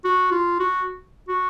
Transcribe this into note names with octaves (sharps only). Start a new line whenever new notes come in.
F#4
F4
F#4
F#4